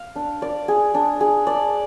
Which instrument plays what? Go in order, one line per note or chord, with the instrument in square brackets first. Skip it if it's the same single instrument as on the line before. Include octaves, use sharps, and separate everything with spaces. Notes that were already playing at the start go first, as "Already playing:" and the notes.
Already playing: [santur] F5
D4
D5
G#4
D4
G#4
D5